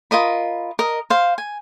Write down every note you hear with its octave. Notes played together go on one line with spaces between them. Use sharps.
F4 A#4 D#5 B5
A#4 D#5
C5 F5
G#5